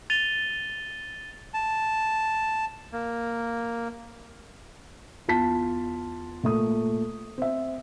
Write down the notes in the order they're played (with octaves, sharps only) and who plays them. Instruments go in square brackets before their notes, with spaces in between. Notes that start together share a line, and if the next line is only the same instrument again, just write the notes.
[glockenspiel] A6 D#7 F7 G7
[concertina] A5
A#3
[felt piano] E2 F4 A5 B6
A#2 A3 D#6
C4 E5